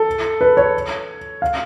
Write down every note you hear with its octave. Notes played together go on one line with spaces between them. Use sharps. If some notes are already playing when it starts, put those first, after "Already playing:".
Already playing: A4
B4
C#5
F5